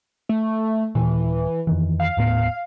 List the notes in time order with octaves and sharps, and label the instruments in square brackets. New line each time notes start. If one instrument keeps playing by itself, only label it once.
[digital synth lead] A3
[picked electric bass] D#1 A#2 [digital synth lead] E3
[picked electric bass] F2 D#3 E3
[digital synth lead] F5
[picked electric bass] D#1 A2 B3